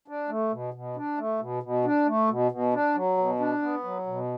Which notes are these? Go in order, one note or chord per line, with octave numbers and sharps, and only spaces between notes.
D4
A3
B2
B2
D4
A3
B2
B2
D4
A3
B2
B2
D4
F#3
B2
D4
B3
F#3
B2